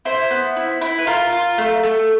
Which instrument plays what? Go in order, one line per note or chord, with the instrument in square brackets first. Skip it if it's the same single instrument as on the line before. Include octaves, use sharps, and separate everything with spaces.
[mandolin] E4 C5
B3
E4
E4
B4
F4 A#4
F4
A3
A3